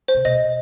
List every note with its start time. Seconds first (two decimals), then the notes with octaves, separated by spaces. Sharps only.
0.08 C5
0.14 C3
0.25 B2 D#5